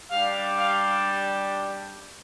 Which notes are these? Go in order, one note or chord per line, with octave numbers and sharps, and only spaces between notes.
G3 D4 G4 F5
F5